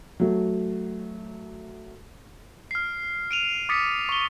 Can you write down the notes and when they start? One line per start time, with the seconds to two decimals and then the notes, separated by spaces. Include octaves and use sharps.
0.20 F#3 A3
2.71 F6 C7
3.31 D7 D#7 F7
3.69 D6 D#6 A6 B6 C#7
4.09 C#6 G7